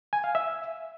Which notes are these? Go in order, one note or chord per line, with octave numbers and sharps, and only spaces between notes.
G#5
F5
E5